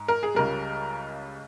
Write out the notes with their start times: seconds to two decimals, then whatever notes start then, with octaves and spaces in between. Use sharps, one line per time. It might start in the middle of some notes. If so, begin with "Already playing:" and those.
Already playing: G#2
0.08 A#4
0.23 G#4
0.34 C#2 C#3 G3 A#4